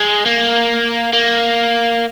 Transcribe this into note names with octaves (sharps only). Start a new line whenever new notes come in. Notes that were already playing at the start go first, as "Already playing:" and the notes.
Already playing: G#3
A#3
A#3